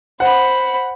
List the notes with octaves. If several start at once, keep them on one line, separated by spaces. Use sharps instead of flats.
C5 F#5 B5